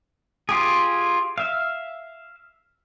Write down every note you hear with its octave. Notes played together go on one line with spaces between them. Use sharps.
F4 G4 G#4
E5 F5